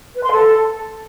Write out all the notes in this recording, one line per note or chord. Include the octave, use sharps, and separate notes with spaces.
B4
C6
A4